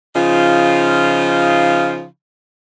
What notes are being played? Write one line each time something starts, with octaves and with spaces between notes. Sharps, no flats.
C#3 F3 D#4 F4